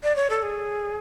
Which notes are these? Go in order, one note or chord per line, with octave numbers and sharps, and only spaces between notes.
D5
C#5
A4
G#4